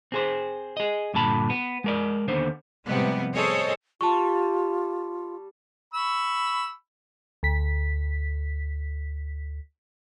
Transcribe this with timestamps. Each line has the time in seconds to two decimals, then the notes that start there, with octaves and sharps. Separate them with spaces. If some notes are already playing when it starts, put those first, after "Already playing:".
0.12 C4 G#4 C5
0.77 G#4 D#5
1.14 G2 A#2 D3 A5 B5
1.50 B3
1.84 G#3 A#4 D5
2.28 D#2 D3 B3 C5
2.86 A2 C3 F3 G3 G#3 B3
3.34 G#4 A4 C5 C#5 D#5
4.01 G3 F4 A5 C#6
5.94 B5 C#6 E6
7.43 D2 B6